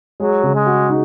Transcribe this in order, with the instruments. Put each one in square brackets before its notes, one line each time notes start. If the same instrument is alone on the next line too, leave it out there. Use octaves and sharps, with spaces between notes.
[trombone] F#3 [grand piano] G#3
[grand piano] C#3
[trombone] G#3
[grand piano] F#4
D#4